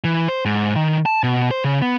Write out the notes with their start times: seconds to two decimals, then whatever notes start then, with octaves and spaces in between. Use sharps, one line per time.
0.04 E3
0.28 C5
0.45 G#2
0.76 D#3
1.06 A5
1.23 B2
1.51 C5
1.64 C#3
1.82 B3